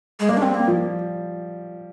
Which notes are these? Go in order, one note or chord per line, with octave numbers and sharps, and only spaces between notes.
G#3
G3 A#3
D4
C4
A#3
F3